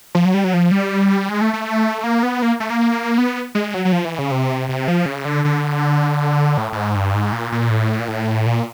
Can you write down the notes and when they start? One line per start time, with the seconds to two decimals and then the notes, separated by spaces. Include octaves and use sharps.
0.15 F3
0.25 F#3
0.34 G3
0.44 F#3
0.54 F3
0.71 G3
1.29 G#3
1.41 A3
1.53 A3
2.04 A#3
2.23 B3
2.42 A#3
2.60 A3
2.70 A#3
3.18 B3
3.55 G#3
3.74 F#3
3.85 F#3
3.92 F3
4.05 E3
4.19 C#3
4.31 C3
4.69 C3
4.88 F3
5.06 C#3
5.25 D3
5.45 D3
6.58 A2
6.72 A2
6.76 G#2
6.96 G2
7.14 G#2
7.33 A#2
7.52 A#2
7.70 A2
7.99 A#2
8.08 A2
8.46 A#2